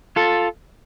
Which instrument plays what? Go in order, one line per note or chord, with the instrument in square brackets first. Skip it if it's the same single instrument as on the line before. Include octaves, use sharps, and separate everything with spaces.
[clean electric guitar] F4 A4